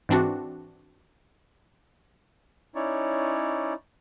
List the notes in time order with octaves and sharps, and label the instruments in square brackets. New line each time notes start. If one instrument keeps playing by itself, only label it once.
[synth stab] G#2 E3 C4 D4 F#4
[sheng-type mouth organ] C#4 D#4 E4 C#5 D5